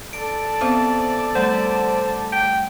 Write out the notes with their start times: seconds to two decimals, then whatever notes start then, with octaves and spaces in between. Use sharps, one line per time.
0.13 A4 D5 A5 D7
0.61 B3 C4 C5
1.35 G3 A3 C5 F#5
2.32 G5